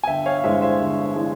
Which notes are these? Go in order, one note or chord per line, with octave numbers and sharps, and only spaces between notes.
G#5
G1 E5 G5
C#5 F5
F5
G2 E3 G#3 C5 E5
C5 E5
G1
E3 G#3